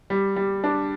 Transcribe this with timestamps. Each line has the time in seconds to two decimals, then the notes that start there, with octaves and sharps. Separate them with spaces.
0.10 G3
0.36 G3
0.64 D4